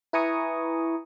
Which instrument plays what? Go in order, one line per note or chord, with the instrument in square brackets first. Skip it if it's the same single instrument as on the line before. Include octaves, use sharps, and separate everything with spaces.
[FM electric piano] E4 B4 G#5 A#5 C#6 D#6